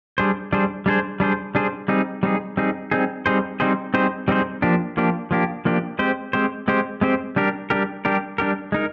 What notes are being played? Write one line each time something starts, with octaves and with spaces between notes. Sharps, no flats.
G3 D4 G#4 C5
G3 D4 G#4 C5
G3 D4 G#4 C5
G3 D4 G#4 C5
G3 D4 G#4 C5
G3 C4 D#4 G#4
G3 C4 D#4 G#4
G3 C4 D#4 G#4
G3 C4 D#4 G#4
G3 C4 D#4 G#4 C5
G3 C4 D#4 G#4 C5
G3 C4 D#4 G#4 C5
G3 C4 D#4 G#4 C5
F3 A#3 D4 G4
F3 A#3 D4 G4
F3 A#3 D4 G4
F3 A#3 D4 G4
G#3 C4 G4 C5
G#3 C4 G4 C5
G#3 C4 G4 C5
G#3 C4 G4 C5
G3 D4 G4 A#4
G3 D4 G4 A#4
G3 D4 G4 A#4
G3 D4 G4 A#4
G#3 D#4 A#4